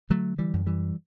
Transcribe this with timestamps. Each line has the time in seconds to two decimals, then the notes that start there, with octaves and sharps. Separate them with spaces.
0.10 D3 F#3 A3
0.38 E3 G3
0.53 F#2
0.66 E3 G3